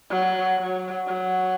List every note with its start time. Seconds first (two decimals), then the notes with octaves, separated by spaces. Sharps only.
0.10 F#3
0.58 F#3
1.07 F#3